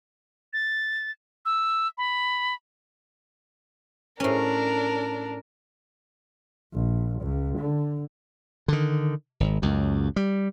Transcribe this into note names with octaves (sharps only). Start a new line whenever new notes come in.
A6
E6
B5
A2 C#4 D4 A#4
A#1
C#2
D3
D3 D#3
G#1
C#2 F#2
G3